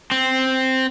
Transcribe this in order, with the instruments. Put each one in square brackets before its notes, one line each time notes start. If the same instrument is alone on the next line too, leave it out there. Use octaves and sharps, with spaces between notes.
[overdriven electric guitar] C4